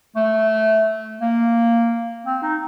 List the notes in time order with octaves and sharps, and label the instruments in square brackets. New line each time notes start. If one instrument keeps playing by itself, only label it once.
[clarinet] A3
A#3
C4
D#4